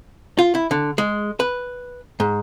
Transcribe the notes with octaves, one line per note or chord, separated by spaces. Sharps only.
F4
E4
D3
G#3
B4
G#2